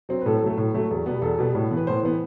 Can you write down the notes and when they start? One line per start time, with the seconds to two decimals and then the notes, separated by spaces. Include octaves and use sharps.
0.09 F#3 C4
0.21 B4
0.26 A2 A4
0.42 F#3 A3
0.58 A2
0.74 F#3 A3
0.91 E2
1.06 B2 G3 B3
1.22 E2 A4
1.39 B2 G3 B3
1.55 A2
1.71 E3 B3
1.77 B4
1.87 A2 C5
2.03 E3 B3